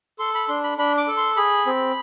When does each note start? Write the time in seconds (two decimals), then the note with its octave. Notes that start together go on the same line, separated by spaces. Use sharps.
0.19 A4 C6
0.35 B5
0.48 D4 C6
0.64 B5
0.78 D4 B5
0.97 D6
1.08 A4
1.17 C6
1.37 G#4 B5
1.66 C4